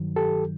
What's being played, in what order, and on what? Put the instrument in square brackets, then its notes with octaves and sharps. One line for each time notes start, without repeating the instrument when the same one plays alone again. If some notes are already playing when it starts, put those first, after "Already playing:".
Already playing: [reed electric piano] G2 D#3 F#3
G4 A4